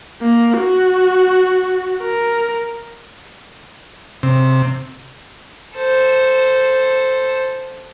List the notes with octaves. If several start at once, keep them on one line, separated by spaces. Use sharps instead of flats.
A#3
F#4
A#4
C3
A4 C5